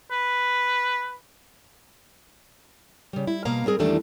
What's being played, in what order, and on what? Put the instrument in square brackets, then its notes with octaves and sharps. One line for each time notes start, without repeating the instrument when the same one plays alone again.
[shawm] B4
[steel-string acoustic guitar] C#3 G3
E4
B2 A#3 F5 A#5
G3 C4 G#4 A#4
E2 D#3 E3 G3 A3 D4